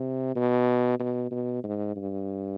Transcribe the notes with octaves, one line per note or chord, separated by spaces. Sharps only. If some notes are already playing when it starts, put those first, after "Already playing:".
Already playing: C3
B2
B2
B2
G#2
G2